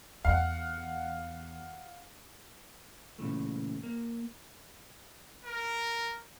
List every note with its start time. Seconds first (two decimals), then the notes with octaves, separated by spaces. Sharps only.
0.25 E2 F5 F#5
3.19 A#2 C#3 E3 A3
3.83 A#3
5.45 A#4